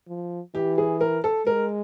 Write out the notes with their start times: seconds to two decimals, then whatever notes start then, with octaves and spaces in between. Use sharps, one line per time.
0.08 F3
0.55 E3 G4
0.78 G#4
1.01 A#4
1.24 A4
1.47 G#3 A#4